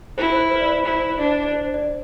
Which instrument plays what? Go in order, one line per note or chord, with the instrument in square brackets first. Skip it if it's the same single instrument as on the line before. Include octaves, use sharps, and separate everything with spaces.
[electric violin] E4 [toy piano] C5
[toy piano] C5
B4
D5
C5
[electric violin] E4 [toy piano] C5
[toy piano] C5
[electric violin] D4 [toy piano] D5
[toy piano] D5
C5
D5